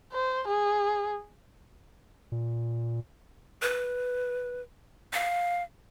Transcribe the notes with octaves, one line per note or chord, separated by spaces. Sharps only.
C5
G#4
A#2
B4
F5